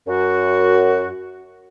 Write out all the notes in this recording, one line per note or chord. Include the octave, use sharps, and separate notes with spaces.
F#2 F#4